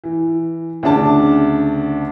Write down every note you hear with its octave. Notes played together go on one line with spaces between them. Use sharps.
E3
D2 C#3 D4 A5